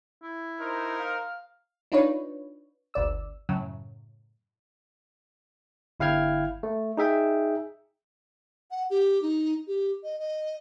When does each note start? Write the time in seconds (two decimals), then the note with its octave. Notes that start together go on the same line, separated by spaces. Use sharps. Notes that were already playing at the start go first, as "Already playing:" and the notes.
0.23 E4
0.59 D#4 A#4 C5
0.99 F5
1.92 D4 D#4 F4 B4 C#5
2.94 G1 D2 D5 E6
3.49 F#2 A2 C#3 F#3
6.00 G1 E4 F5 G5 F6 G#6
6.63 A3
6.97 D#4 G#4 E5 G5
8.71 F#5
8.90 G4
9.22 D#4
9.67 G4
10.03 D#5
10.19 D#5